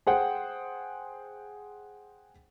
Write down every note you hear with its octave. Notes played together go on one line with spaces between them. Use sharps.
G#4 C5 F#5 G5